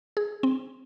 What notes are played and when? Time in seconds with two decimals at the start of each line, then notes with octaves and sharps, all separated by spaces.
0.17 G#4
0.43 C4